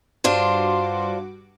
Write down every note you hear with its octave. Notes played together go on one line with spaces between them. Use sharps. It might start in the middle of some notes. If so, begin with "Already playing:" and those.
G2 D4 F4 F#4 C5 D6